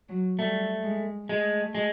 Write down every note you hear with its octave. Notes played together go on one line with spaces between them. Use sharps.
F#3
G3 A3
G#3
G#3 A3
G#3